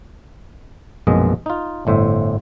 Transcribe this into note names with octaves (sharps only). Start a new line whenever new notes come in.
A#1 F#2 B2 G#3 D#5
D#4 F4
G1 A2 C5 E5